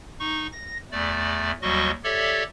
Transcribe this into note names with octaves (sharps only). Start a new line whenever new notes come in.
D#4 C#6
A#6
E2 A3 D5
D#2 F#3 G3 F#4 D#5 C#6
G4 A4 C#5 D5 E5